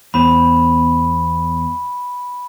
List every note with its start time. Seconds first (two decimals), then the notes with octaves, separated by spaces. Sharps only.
0.14 E2 B3 C5 B5